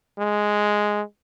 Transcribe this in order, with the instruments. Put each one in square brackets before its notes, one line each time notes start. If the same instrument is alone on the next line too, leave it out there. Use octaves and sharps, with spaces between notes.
[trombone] G#3